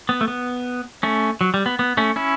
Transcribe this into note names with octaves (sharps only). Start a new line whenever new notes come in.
B3
A3
B3
A3 C#4
F#3
G3
B3
B3
A3 C#4
C#4 E4